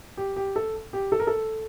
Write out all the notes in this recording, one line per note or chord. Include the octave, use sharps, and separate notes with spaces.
G4
G4
A4
G4
A4
A#4
A4